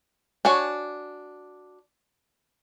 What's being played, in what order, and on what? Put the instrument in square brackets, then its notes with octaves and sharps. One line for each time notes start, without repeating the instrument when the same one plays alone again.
[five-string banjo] D4 F#4 C#5 G#5